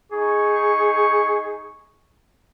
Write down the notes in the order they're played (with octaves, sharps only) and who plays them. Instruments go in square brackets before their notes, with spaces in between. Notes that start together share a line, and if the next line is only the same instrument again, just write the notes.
[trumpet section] D#4 C#6 [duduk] G#4